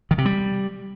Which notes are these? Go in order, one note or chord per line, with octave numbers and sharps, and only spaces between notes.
D#3
C3
G3